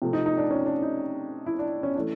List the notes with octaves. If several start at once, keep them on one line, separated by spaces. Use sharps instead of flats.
C3 F3 A3
D#4
D#4
D4
C#4
D4
D#4
E4
D4
C#4
D4
E3 A3